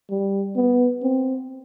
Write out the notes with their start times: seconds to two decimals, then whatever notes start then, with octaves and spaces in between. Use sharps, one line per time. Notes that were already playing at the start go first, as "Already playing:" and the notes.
0.10 G3
0.56 B3
1.03 C4